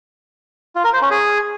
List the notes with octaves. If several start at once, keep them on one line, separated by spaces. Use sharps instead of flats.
F4
A#4
C5
C#4
G#4